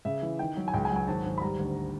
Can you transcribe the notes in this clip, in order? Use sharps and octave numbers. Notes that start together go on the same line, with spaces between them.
C#3 E5
E3
D#3 G5
F#3
G#5
C#2 G5
G#5
F#3
G#5
G#1 A5
G#1
B5
G3 A#5
D2